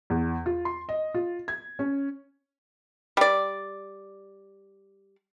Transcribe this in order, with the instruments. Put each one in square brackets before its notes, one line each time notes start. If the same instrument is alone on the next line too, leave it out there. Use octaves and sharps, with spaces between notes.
[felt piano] E2
F4
C6
D#5
F4
G#6
C#4
[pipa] G3 D5